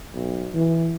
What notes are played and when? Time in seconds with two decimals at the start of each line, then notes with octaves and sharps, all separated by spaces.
0.14 B1
0.54 E3